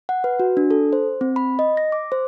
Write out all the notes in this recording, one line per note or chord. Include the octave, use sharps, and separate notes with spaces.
F#5
B4
F#4
D4
A4
C5
C4
B5
D#5
A#6
D6
C5